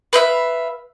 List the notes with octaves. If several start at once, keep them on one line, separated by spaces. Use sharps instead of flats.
B4 C5 E5 F5